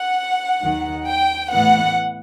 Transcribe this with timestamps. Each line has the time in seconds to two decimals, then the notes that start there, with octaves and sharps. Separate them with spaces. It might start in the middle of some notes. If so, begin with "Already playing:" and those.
Already playing: F#5
0.61 D#2 D#3 F#3
1.05 G5
1.50 A2 E3 B3 F#5